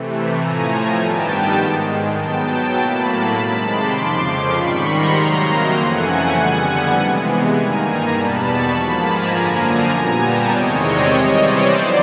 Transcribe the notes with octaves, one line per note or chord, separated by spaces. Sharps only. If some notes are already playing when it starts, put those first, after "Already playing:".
Already playing: C3 E3 A3
A2 F3 A3 G#5 A#5
G#5 A#5
G2 D#3 G3 B3 G5 A5
G#2 D#3 G#3
B2 F#3 B3 G5 A5
A2 F#3 A#3 A5 B5
C3 D#3 G#3
C6 D6
F2 C#3 F3
C6 D6
G#2 D#3 G3 B5 C#6
A#5 C6
C3 D#3 F#3 A#3
F2 C#3 E3 A3 F#5 G#5
F2 D3 G3 B3
C3 E3 G#3 B3
G2 D#3 G3 A#3 G#5 A#5
G#5 A#5
E2 B2 G3 B3 A5 B5
B5 C#6
G#2 F3 A#3 A5 B5
G#5 A#5
F#2 D3 F3 A#3
A#2 G3 B3
G5 A5
E2 C3 D#3 G#3 C4 C#5 D#5
C5 D5
C3 E3 G3 C#5 D#5
C5 D5
F2 D3 F#3 B3